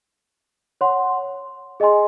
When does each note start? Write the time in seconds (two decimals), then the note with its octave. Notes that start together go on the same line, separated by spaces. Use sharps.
0.81 C#5 F#5 C6
1.80 G#4 D#5 G#5 C6